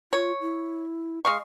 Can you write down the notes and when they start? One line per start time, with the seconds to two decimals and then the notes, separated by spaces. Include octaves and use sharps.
0.13 F4 C#5
0.41 E4
1.25 G#3 D#5 F5 C#6